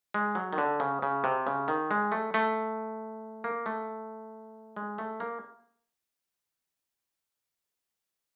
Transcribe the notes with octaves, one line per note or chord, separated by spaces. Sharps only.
G#3
F#3
D#3
D3
C#3
C#3
C3
C#3
D#3
G#3
A3
A3
A#3
A3
G#3
A3
A#3